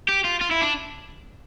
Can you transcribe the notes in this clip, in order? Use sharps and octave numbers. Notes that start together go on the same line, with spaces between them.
G4
F4
F4
E4
D4